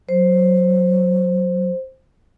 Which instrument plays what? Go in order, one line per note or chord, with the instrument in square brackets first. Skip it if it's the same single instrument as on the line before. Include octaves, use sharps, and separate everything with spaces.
[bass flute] F#3 [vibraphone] C5